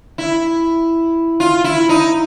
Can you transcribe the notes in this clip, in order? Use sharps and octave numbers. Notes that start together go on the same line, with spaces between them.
E4
F4
E4
D#4